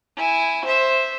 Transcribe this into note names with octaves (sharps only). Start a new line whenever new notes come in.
E4 G#5
C5 E5